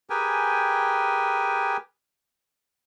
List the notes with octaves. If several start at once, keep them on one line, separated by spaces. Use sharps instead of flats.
G4 G#4 A#4 B4 G5 G#5